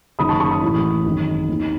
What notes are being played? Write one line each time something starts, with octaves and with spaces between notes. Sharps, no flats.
F#1 F#2 D#3 B5 D#6
A5 C#6
A5 C#6
B5 D#6
A1 A2 E3
G#1 F#2 D#3
D#2 D#3